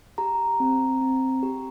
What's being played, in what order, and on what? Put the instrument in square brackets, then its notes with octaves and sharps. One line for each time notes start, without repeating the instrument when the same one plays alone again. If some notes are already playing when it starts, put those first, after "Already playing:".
[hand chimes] G4 A#5
C4
C4
G4